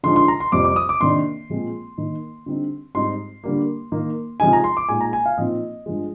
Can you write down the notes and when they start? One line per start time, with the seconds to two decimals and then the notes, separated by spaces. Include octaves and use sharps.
0.03 D3 F3 G#3 D#4 C6
0.16 C6
0.28 A#5
0.40 C6
0.52 F2 C3 G3 D6
0.65 D6
0.76 D#6
0.89 D6
1.01 C3 D#3 A#3 D4 C6
1.50 A#2 F3 G#3 C4
1.98 D#3 A#3 D#4
2.46 D3 G3 C4 D#4
2.95 G#2 G3 C4 D#4 C6
3.44 D3 G3 A#3
3.92 D#3 A#3 D#4
4.40 C3 F3 G#3 D#4 G#5
4.53 A#5
4.64 C6
4.77 D6
4.89 A#2 G#3 D#4 G#5
5.01 A#5
5.13 G#5
5.26 F5
5.38 A#2 F3 C4 D#4 D#5
5.86 G2 F3 G#3